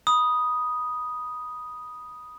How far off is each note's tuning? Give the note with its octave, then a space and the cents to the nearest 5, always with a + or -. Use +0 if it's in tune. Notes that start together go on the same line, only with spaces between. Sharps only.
B5 -15 D#6 +0